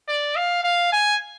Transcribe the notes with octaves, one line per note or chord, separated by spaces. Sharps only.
D5
F5
F5
G#5